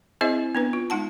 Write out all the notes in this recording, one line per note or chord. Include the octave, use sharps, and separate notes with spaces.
C4 E4 G#4 C5 D#5 E5
B3 D4 B4
F4
G#3 D#4 F#5 A5